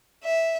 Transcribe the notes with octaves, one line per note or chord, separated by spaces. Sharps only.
E5